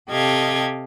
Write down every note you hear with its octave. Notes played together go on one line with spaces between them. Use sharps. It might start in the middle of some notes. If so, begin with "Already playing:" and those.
C3 G4 A4 D#5 F5 G#6